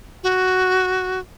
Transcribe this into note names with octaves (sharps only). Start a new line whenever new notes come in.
F#4